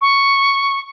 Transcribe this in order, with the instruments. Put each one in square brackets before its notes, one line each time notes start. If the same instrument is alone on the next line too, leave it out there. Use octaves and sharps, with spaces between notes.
[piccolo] C#6